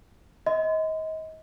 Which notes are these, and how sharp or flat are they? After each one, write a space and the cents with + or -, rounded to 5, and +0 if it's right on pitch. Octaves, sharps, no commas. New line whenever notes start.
D#5 +30 C6 -35